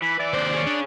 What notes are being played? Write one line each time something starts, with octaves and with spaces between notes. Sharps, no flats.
E3 B5
E3 D5
D#2 C3 D4 C5
G#4 C#5
D4